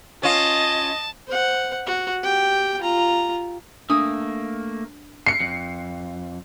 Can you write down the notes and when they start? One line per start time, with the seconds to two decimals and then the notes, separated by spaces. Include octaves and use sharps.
0.23 C#4 F4 D#5 A5
1.28 C5 F#5
1.86 F#4
2.23 G4 G5
2.81 F4 A#5
3.90 A3 A#3 D4 D#6
5.26 C7 C#7
5.40 F2